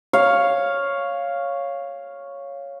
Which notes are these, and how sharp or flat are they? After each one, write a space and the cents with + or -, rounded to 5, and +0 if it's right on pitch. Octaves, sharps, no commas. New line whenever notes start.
C#5 +0 F5 +0